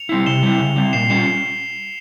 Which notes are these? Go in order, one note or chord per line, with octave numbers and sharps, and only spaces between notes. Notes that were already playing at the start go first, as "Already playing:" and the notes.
Already playing: C#7 F7
G3 C4 E4
C3 E7 G7
G3 C4 E4
C#3
G3 C4
A#2 C7 E7
G3 C#4 F4 C7 E7